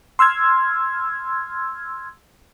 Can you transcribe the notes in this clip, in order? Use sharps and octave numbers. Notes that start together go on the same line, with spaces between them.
C6 E6 F6 G#6